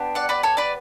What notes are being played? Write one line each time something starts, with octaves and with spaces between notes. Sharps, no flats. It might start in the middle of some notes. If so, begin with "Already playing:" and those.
Already playing: B3 D4 G4
D5 F#5
B4 D5
A4 C#5
B4 D5